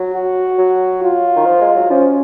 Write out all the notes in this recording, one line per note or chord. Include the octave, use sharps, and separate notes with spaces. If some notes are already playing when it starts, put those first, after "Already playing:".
Already playing: F#3
F#4
F#3
F4
D#3
F3
G#3
F#3
F3 C#4